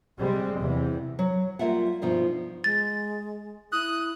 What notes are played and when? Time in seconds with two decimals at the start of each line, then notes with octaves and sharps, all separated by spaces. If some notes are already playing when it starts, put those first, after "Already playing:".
0.19 C3 G3 G#3 C4
0.58 E2 C3 E3
1.19 F#3
1.59 G3 A#3 F4 E5 F#5
2.02 G2 B2 F3 D#4
2.64 G#3 A6
3.72 E4 D#6 F#6